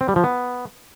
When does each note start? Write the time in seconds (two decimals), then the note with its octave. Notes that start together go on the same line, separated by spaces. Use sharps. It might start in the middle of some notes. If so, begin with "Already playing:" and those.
0.01 C4
0.08 G3
0.16 F3
0.24 B3